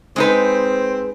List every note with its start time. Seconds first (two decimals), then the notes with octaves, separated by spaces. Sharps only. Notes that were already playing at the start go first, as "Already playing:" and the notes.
0.16 G#3 C4 D#4 B4